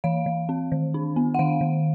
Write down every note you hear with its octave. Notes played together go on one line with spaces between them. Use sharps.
E3 F5
E3
C4
D#3
D4
B3
F#5
D#3 F5
D#3